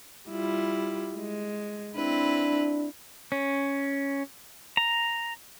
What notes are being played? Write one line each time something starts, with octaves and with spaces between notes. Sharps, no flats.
G3 E4 F4
G#3
C4 D4 E4 B4
C#4
A#5